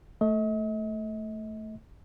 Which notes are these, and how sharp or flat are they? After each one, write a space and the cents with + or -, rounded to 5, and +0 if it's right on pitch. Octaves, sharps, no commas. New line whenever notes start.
A3 +0 D#5 +45